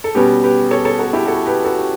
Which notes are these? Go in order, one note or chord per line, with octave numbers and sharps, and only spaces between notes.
A4
B2 G3 C#4 G4 B4
G4 B4
A4 C#5
A4 C#5
F#4 A4
E4 G4
F#4 A4
G4 B4
F#4 A4
G4